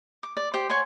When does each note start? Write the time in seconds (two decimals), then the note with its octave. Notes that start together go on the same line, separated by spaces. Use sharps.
0.23 D6
0.37 D5
0.54 G4 C5
0.69 C#5 F#5 G#5 C6